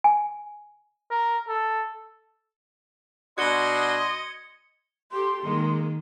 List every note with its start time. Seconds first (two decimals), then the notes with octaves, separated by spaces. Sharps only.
0.04 G#5
1.10 A#4
1.48 A4
3.38 B2 D4 F#4 D#5 C6 G#6 C#7 G7
5.12 G4 A4 C6
5.44 D#3 G#3 A#3